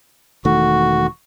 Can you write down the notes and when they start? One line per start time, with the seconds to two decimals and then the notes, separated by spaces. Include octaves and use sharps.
0.45 E1 D#3 A3 F#4